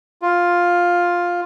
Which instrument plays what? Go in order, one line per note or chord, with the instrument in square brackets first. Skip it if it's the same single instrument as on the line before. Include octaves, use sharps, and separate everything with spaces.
[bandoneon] F4